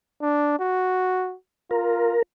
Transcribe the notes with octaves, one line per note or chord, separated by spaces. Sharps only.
D4
F#4
F4 A#4